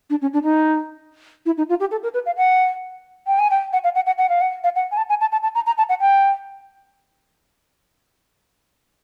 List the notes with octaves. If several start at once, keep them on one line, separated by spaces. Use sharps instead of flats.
D4
C#4
D4
D#4
E4
D#4
F4
G4
A4
A#4
B4
F5
F#5
G5
G#5
G5
F#5
F5
F#5
F#5
F#5
F5
F#5
F5
F#5
G#5
A5
G#5
A5
A5
A5
A#5
A#5
A5
F#5
G5